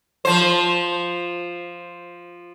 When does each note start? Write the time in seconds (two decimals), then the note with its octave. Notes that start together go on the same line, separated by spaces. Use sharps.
0.25 F3 C5